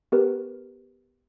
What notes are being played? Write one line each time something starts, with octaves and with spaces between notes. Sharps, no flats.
B3 G4 A#4 B4